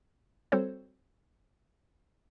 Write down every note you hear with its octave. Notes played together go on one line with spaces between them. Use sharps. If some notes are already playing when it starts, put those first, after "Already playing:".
G3 C4 F#4 A4 C5 C#5